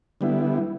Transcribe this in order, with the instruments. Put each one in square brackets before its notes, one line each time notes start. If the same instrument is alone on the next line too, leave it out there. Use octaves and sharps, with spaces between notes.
[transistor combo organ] D3 G3 B3 E4